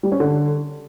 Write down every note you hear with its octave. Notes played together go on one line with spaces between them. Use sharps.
G3
C#4
D3